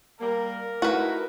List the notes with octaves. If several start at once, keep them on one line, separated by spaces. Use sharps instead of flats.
G3 A#3 A#4
A3 D#4 E4 F#4 B4